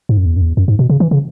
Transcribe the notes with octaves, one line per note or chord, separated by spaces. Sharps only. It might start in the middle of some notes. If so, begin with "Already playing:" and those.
G#2
F#2
E2
F#2
E2
F#2
G#2
B2
C#3
E3
C#3